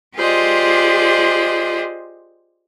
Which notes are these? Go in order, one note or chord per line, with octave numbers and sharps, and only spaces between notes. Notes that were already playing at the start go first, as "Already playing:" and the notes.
F4 G4 G#4 C5 D5 D#5